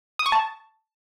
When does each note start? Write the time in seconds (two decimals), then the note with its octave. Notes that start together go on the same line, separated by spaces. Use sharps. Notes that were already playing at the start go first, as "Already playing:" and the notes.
0.19 D#6
0.26 C#6
0.32 A5